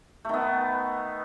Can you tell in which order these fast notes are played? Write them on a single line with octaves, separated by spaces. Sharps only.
A3 D#3 B3